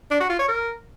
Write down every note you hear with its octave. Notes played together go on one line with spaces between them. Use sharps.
D4
F#4
F4
C#5
A#4